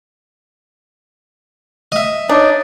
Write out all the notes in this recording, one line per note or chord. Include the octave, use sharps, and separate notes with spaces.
D#5 E5
D4 D#4 C#5